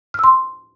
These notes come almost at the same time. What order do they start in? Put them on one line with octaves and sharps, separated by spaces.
F6 E6 C6